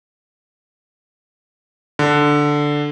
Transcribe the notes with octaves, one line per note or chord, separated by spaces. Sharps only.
D3